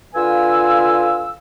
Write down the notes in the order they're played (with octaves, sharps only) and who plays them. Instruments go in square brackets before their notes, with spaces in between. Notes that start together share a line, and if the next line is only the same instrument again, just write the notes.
[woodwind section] D3 F4 B4 F5 G#5 E6